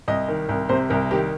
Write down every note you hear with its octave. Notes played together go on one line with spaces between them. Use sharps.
C2 D#5
D#3
C2
C3 C5
C2 A#4
D#3 G4